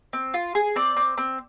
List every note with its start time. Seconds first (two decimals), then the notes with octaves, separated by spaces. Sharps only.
0.13 C4
0.34 F4
0.55 G#4
0.76 C4 D5
0.97 C4
1.18 C4